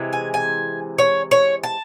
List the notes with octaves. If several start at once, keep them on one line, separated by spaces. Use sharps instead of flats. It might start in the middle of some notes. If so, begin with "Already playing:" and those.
Already playing: C3 E3 G#3
G#5
G#5
C#5
C#5
A5